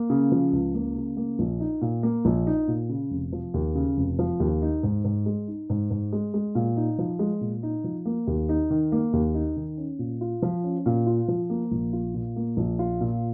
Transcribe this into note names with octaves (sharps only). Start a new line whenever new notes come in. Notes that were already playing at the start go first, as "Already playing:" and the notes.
Already playing: A#3
C#3
F3
C#2
A#3
C#3
A#3
A#1
D#4
A#2
A#3
A#1
D#4
A#2
C#3
F1
F3
D#2
C#3
F1
F3
D#2
D#4
G#2
G#2
G#3
D#4
G#2
G#2
G#3
G#3
A#2
D#4
F3
G#3
A#2
D#4
F3
A#3
D#2
D#4
D#3
A#3
D#2
D#4
D#3
C#4
A#2
F4
F3
C#4
A#2
F4
F3
A#3
A#1
F4
A#2
A#3
A#1
F4
A#2